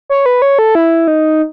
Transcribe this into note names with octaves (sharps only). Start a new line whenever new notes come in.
C#5
B4
C#5
A4
E4
D#4